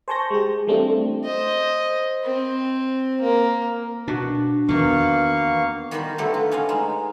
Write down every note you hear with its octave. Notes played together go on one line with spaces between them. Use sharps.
C5 G#5 A5 C#6 G6 A#6
G#3 G4
E3 G3 A3 C4 D4 F4
C5 D#5
C4
A#3
B2 D4 F#4
E2 D#3 A#3 B3 F5 C#6
D#3 G3 F#4 C5 B5
D3 F#3 G3 A3 B3 A4
F4
B3 C#4 D#5 F5
G#3 D#4